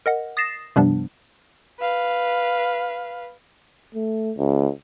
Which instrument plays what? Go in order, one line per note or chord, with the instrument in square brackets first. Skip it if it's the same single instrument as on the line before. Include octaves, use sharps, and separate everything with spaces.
[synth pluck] A#4 D#5 F#5
D#6 A6 A#6 C7 E7
G2 C3 F3 G3 B3 D4
[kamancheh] B4 F5
[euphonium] A3
C#2